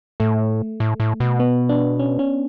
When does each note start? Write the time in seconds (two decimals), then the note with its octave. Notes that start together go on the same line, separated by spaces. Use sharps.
0.20 A2 A3
0.80 A2
1.00 A2
1.20 B2
1.40 B3
1.69 D4
1.99 C#4
2.19 C#4